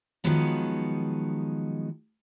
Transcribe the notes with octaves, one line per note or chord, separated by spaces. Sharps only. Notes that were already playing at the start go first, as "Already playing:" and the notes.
D#3 F3 F#3 G#3 B3 D#4